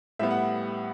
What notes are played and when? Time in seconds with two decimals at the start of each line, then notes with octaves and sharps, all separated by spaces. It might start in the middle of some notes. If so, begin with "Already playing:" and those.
0.19 A2 G3 B3 E5
0.30 F#5